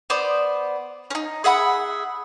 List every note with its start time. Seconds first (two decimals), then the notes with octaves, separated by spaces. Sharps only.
0.10 B3 C5 D5
1.10 C#4 D#4
1.44 G#4 E5 F#5 B5